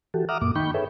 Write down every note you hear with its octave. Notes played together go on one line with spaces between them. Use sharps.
E3 F#4 G4 A4
E5 F#5 A#5 D6 D#6 F6
F#2 A#2 A#3 D6
D#3 D#4 G5 B5 C#6 G6
G#4 A4 B4 C#5 E5